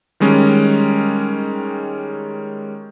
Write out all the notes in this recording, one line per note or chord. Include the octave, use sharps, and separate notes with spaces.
D#3 G3 G#3 C#4